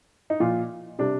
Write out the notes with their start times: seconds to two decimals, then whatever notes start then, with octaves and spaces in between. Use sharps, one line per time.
0.30 D#4
0.40 A#2 F3 F4
0.99 C3 G3 D4